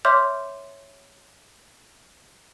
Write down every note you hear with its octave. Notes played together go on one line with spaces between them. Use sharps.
C#5 E5 C6 D6 F6 G6